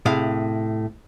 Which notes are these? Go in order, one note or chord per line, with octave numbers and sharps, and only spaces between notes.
A2 C3 G#4 F5